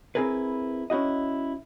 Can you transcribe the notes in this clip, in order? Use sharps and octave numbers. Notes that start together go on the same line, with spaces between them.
C4 E4 G#4 A#4 B4
C#4 E4 F#4 D#5